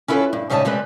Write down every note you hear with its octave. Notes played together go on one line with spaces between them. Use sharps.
C#4 E4 F4 A4 B4
G2
G#2 C#3 G3 D#5 E5 A5
C3 G3 G#3 C4 B4